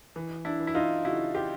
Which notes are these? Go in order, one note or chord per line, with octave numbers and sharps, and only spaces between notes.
E3
D4 E4
E3
E4
D#4 F4
C#3 E4 F#4
F4 G4